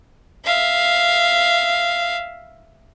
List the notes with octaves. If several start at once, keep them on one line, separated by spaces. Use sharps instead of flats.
E5 F5